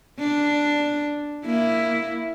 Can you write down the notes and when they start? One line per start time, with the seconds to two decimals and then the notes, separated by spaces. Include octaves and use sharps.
0.19 D4
1.46 A#3 E4